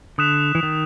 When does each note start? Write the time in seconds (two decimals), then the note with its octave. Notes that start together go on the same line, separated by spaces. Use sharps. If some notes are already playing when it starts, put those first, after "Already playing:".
0.18 D3 D#6 F#6 B6 E7
0.55 E3
0.63 D#3